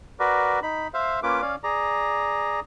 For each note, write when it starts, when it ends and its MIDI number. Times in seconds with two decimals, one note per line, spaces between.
0.20 0.60 66
0.20 0.60 70
0.20 0.60 71
0.20 0.60 74
0.63 0.88 63
0.63 0.88 83
0.94 1.20 72
0.94 1.20 76
0.94 1.20 77
1.23 1.42 58
1.23 1.42 61
1.23 1.42 65
1.23 1.42 71
1.23 1.42 86
1.42 1.56 61
1.42 1.56 74
1.42 1.56 77
1.63 2.60 68
1.63 2.60 74
1.63 2.60 82